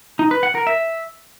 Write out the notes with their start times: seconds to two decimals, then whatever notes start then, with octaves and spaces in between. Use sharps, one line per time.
0.19 D#4
0.31 B4
0.43 F#5
0.55 A#4
0.67 E5